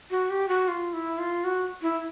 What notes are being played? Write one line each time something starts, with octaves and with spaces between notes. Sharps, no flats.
F#4
G4
F#4
F4
E4
F4
F#4
E4